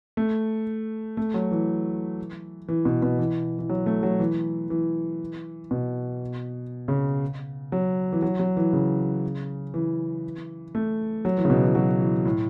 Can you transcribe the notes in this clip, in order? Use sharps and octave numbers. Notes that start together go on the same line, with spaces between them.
A3
A3
F#3
E3
E3
B2
B2
E3
E3
F#3
A3
F#3
E3
E3
B2
C#3
F#3
E3
F#3
F#3
E3
C#3
E3
A3
F#3
E3
C#3
B2
E3
F#3
E3
A2